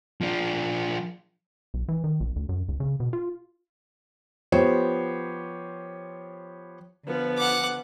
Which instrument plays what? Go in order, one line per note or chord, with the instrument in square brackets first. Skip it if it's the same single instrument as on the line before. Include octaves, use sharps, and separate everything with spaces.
[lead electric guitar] F3 D4
[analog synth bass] B1
E3
D#3
A#1
D2
F#2
C#2
C#3
B2
F4
[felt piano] F3 B3 G4 C5 C#5
[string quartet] D3 F3 B3
[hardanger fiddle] F#5 D6